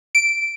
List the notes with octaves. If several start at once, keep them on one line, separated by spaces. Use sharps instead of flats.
D7